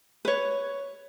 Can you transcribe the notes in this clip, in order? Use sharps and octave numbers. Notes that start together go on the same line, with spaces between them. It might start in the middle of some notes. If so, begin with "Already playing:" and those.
B4 C#5